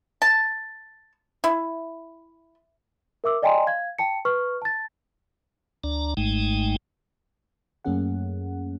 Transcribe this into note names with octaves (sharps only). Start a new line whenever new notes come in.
A5
E4
A#4 E5 D6 E6
D5 D#5 G5 G#5 A#5 C6
F5 G#6
G5 A5 C#7
B4 C#6 F6
A5 A6
D2 D4 D5 A#5
G#1 G#2 G#3 A3 D#4 G5
F#2 A3 A#3 C#4 G#4 F#5